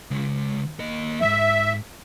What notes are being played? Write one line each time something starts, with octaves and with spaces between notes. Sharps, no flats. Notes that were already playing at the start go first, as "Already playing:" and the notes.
C#2 G#3
A#3 D#5
F2 G#2 E5